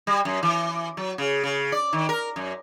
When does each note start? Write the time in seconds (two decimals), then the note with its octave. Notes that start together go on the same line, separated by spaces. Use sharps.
0.07 G3
0.25 F#2
0.43 E3
0.97 F#3
1.18 C#3
1.44 C#3
1.72 D5
1.93 D#3
2.09 A#4
2.36 F#2